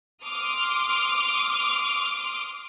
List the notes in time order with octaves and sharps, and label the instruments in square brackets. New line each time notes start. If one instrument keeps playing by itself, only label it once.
[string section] C6 D6 D#6 F6